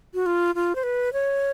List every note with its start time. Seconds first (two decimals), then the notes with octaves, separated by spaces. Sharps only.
0.14 F#4
0.26 F4
0.55 F4
0.75 C5
0.83 B4
1.13 C#5